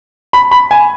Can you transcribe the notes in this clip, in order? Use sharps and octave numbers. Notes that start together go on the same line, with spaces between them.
B5
B5
G#5